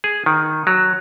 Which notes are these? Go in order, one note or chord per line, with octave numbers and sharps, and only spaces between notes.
G#4
D#3
F#3